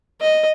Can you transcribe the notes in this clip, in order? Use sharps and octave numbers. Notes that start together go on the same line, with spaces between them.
D#5